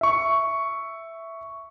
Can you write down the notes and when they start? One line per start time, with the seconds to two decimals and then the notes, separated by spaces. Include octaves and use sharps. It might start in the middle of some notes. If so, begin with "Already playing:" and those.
0.01 E5 C#6